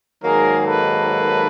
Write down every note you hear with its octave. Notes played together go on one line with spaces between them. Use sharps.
G#2 D#3 F#3 A#3 G#4 A#4
A4 B4